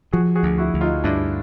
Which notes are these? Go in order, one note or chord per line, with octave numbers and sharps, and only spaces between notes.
F3 F#4 G#4
F#4 G#4
D2
E4 F#4
D2
D#4 F4
G2 D4 E4